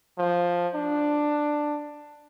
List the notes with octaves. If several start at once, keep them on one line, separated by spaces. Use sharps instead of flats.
F3
D4